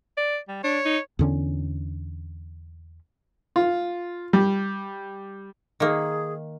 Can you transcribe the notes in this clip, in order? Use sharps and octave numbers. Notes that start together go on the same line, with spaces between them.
D5
G3
D4 C#5
D#4
E2 D3 C#4
F4
G3
D#3 A#3 G#4